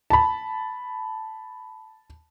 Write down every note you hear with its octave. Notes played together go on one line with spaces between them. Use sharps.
A5 B5